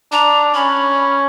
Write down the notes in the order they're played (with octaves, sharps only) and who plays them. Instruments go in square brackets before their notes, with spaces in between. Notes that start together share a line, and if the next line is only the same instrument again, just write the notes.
[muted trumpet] D4 [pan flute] A#5
[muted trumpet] C#4 [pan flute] B5